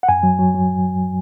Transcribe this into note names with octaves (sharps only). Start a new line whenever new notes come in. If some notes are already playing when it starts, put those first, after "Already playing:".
F#5
F#2 G#5
F#3
F#3
F#3